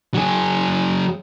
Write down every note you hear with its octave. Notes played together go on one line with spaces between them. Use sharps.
F#3 G#4